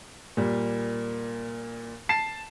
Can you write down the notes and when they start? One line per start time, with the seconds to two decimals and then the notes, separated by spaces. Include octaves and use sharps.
0.37 A#2 G3
2.09 A5 C7 E7